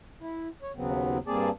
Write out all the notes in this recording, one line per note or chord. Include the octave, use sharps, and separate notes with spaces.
E4
C#5
D#2 C#3 F#3 B3 C4
G2 A#3 C4 G#4 D5 A5